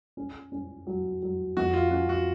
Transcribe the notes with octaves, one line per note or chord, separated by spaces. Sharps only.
C#4
C#4
F#3
F#3
F2 F#4
F4
C#4 F#4
F#4